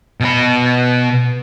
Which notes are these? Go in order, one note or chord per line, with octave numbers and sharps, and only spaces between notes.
B2 B5